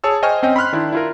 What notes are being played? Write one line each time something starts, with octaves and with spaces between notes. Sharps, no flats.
G#4 C#5 A5 E6
C5 D#5 G5 G#5 C#6 F6
C4 C#4 D#5 G5
B5 C6 F6 F#6
D#3 D4 E4
E4 F4 A#4